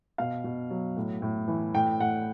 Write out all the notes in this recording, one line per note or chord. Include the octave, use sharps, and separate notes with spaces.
B2 F5
B2
F#3
A2
A2
E3
A2 G5
A2 F#5